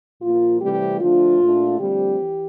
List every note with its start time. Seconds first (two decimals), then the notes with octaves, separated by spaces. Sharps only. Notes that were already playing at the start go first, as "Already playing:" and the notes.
0.22 A#2 F3 A#3 F4
0.61 C3 E3 G3 A3 C4 G4
1.00 D3 F3 A3 D4 F4
1.40 A#2 A3 D4
1.79 D3 F3 G3 A3 C4 G4
2.18 E3